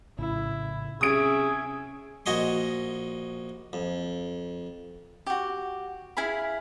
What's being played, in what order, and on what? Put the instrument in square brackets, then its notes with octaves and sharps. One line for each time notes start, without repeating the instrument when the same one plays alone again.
[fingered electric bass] A#1 A2 C#3 [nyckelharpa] E4
[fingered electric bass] C3 [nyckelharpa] C#4 E5 [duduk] G#4 [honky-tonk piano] D#6 D7
[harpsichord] A#1 F#4 D#5 G#5 C6
F2
[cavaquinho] F#4 G4
E4 G#4 F5 B5